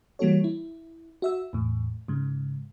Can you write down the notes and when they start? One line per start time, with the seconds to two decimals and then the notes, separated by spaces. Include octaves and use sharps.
0.19 E3 G3 A#3 F#4 A4 C#5
0.44 E4
1.22 F#4 E5 E6
1.53 E2 A2
2.08 G#2 C#3